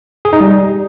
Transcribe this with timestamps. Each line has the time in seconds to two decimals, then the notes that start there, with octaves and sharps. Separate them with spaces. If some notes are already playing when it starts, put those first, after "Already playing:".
0.25 G#4
0.33 D#4
0.41 G3